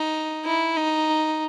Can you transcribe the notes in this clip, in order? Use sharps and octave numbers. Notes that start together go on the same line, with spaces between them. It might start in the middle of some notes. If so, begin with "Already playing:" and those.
Already playing: D#4
E4
D#4